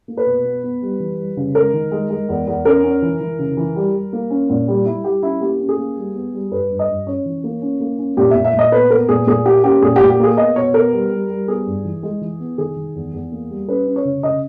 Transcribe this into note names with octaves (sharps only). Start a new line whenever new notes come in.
A#3
B4
B2
B3
B3
G3
E3
G3
C#3
G#3 A#4
D#3
G#3
G#3
E2
E2
C#4 A#4
C#4
E3
E3
C#3
E3
G3
G3
A#3
C#4
A#2
G3
G3 E4
G3 G4
C#4 E4
A#3 G4
C#4
G#4
A#3
G3
B3
G3
G2 B4
G2
D#5
G2
C#4 C#5
E3
A#3
C#4
A#3
C#4
A#2 G4
A#2 E5
E5
A#2
D#5
B3 B4
B3 A#4
A#2 G#4
A#2 G#4
A#3 G4
C#4 G4
A#2 G#4
A#2 G4
G4
A#3 G#4
B3 D#5
B2 C#5
B3 A#4
G3
G3
G3
B3 G#4
G2
E3
G#3
E3
B3
D#3 G#4
D#3
E2
E2
A#3
G3
C#4 B4
C#4
C#5
C#3
C#3 D#5